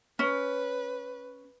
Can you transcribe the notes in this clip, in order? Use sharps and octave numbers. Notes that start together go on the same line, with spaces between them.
C#4 B4